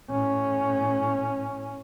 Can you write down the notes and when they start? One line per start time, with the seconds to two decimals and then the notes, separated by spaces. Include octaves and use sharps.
0.11 A2 C#4